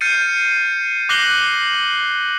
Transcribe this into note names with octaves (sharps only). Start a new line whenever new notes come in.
F6 G6 A6 C7 C#7 D#7
D6 F#6 A#6 C7 F#7 G7